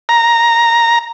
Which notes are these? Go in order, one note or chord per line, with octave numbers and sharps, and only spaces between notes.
A#5